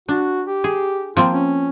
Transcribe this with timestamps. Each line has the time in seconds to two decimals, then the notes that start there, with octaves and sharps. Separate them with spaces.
0.08 D4 F#4
0.47 G4
0.64 G#4
1.17 F3 A#3 C4 F4
1.33 C#4